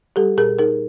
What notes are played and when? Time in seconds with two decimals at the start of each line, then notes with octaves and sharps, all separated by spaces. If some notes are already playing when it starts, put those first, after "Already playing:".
0.16 G3 G4 A4
0.37 A#2 G#4 A#4
0.59 D#4 G#4 A#4